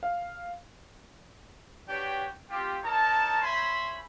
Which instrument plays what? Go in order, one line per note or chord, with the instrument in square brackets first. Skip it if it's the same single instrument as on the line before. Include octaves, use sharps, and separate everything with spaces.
[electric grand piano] F5
[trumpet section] D4 F#4 G4 B4 C#5 G5
C4 F4 G4
D#4 A4 A#4 C#5 A5
C5 C#5 E5 G#5 B5